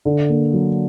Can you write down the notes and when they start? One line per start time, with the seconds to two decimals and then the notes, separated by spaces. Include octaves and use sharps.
0.05 D3
0.30 A#3
0.53 F#3